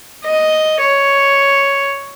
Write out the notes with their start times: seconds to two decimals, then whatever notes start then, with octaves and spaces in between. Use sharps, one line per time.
0.25 D#5
0.80 C#5